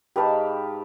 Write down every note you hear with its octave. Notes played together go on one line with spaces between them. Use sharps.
G#2 G4 B4 F5 G5 A5